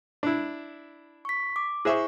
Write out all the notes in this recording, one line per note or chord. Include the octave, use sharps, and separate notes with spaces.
D4 E4
C#6 B6
D6
E4 G#4 C5 E5 C#6